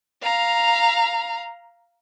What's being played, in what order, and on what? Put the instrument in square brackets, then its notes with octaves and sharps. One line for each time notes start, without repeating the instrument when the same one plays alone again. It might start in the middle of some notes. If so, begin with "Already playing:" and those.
[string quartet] F5 A#5